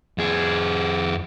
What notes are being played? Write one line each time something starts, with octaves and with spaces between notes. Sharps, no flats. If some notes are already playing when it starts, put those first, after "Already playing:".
F2 G#4